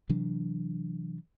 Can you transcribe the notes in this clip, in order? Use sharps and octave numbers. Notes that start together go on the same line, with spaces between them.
C3 E3 F#3 D4